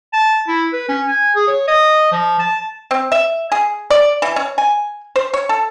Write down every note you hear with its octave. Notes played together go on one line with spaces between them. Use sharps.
A5
E4
B4
C#4
G#5
G#4
C#5
D#5
F3
A5
C4
E5
G#4
D5
E3
C#4
G#5
C5
C#5
A4